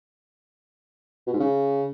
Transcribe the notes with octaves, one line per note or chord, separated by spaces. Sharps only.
B2
G#2
C#3